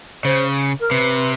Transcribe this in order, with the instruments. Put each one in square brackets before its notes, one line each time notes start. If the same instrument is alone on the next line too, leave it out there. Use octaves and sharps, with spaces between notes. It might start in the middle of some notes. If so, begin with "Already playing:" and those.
[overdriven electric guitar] C#3 [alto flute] C5
[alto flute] A#4
[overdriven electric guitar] C3 [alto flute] B4